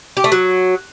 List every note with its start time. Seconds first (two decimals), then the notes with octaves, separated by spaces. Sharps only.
0.17 G4
0.24 A3
0.32 F#3